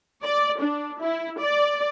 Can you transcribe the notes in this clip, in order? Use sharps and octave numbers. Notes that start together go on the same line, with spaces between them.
D5
D4
E4
D5